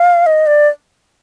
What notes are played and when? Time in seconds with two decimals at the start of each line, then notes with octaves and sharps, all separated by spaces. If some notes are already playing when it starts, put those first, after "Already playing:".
Already playing: F5
0.26 D#5
0.47 D5